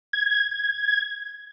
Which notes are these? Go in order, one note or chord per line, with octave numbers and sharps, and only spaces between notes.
G#6